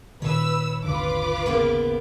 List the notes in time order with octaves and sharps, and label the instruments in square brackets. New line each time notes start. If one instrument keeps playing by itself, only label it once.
[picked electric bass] A#2 D#3 [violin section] B4 E6 [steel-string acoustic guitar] C#5
[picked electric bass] G#1 D#2 D3 [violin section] F4 B4 D6
[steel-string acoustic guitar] C#3 A#3 B3